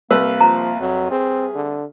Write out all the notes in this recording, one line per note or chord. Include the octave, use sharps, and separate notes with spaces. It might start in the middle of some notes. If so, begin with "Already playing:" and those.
C2 A#3 B4 E6
F3 A#5
F2 F#3
C4 G#4
D3